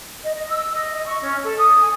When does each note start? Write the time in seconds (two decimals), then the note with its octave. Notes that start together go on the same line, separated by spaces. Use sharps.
0.23 D#5
0.35 D#5
0.49 E6
0.74 D#5
0.95 D#5
1.07 C#6
1.21 C#4
1.43 A4
1.58 D#6
1.80 G#5